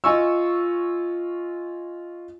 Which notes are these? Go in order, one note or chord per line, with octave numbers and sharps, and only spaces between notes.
F4 D#5 G#5 C#6 E6